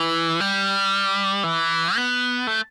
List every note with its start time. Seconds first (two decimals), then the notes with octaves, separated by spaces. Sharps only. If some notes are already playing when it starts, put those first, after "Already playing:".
Already playing: E3
0.40 G3
1.44 E3
1.96 B3
2.47 A3